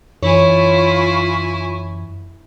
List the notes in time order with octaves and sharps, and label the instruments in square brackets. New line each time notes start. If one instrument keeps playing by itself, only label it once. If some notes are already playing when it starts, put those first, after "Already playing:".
[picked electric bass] F#2 E3 [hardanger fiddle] E4 G#5 [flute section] F4 C#6 [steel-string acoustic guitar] C#5